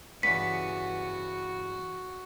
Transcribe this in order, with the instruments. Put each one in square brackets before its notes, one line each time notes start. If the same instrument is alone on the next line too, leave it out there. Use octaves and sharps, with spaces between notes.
[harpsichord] G2 C#3 E3 [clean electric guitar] B3 [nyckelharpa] F#4 [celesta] B6